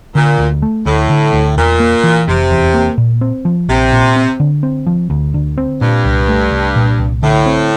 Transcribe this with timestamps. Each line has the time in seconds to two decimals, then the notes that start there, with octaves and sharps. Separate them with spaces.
0.15 A#2 D3
0.39 D2
0.62 A3
0.86 D2 A2
1.10 D3
1.33 D2
1.57 E2 A#2
1.80 A#3
2.03 E3
2.28 F1 C3
2.51 E2
2.74 A#3
2.98 A#2
3.21 C4
3.45 F3
3.69 A#1 C3
3.92 A#2
4.16 C4
4.40 D3
4.63 C4
4.86 F3
5.10 D2
5.34 D3
5.58 C4
5.81 G2 A#2
6.05 C2
6.28 A3
6.51 C2
6.76 A#2
6.99 C2
7.23 A2 D3
7.46 C4